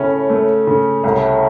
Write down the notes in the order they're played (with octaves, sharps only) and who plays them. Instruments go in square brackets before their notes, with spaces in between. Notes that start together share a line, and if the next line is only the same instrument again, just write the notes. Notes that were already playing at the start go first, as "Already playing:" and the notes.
Already playing: [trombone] A2 [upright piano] C#3 C#4
[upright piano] A3
C#3
[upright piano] C2 [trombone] A2